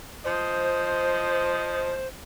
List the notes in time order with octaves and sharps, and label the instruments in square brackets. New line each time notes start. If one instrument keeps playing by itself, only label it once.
[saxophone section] F3 D#5 [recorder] C5